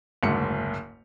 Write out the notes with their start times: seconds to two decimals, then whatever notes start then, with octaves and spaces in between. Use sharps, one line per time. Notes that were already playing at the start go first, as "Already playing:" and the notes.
0.23 F#1 D2 G#2 C#7